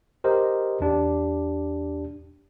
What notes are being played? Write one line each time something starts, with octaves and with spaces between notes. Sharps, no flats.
G4 A#4 C5 D#5
E2 D4 G4